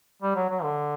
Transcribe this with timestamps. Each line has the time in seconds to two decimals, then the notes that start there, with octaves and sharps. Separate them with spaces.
0.22 G3
0.36 F#3
0.50 F#3
0.63 D3